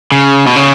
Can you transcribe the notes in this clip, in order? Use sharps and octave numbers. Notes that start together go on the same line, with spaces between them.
C#3
B2
C#3